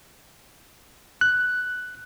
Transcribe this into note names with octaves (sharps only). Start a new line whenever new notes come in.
F#6